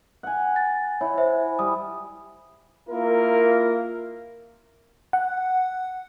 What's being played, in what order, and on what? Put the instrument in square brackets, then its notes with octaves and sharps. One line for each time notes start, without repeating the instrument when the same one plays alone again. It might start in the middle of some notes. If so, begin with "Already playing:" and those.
[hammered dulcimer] F#5 G#5
[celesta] A6
[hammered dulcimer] E4 [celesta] C#5
[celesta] C5 E5
[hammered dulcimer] G3 [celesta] D#6
[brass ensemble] A#3 E4 F4 A#4
[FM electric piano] F#5